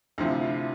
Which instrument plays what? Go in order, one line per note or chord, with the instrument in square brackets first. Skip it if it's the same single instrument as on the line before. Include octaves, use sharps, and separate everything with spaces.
[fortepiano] D2 C3 F3 [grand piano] E4
[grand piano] F4